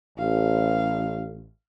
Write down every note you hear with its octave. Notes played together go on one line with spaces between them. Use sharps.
A1 F5